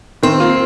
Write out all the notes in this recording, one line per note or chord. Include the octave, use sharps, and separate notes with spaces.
D#3 C4
A#3 F4